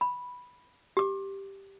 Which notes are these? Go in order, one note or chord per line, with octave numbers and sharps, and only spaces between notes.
B5
G4 D6